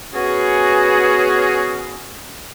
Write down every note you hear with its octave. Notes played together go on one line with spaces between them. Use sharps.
B3 C#4 F#4 G#4